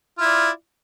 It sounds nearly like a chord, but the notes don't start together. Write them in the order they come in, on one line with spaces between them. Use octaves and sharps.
F4 E4 D5